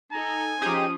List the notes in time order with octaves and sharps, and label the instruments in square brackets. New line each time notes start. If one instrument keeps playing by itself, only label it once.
[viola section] D#4 A4 [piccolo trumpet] G#5 [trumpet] A#5
[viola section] F3 C#4 C5 [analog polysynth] D#4 G4 G#4 [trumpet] D#6